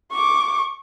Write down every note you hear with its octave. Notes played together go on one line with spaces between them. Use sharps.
C#6 D6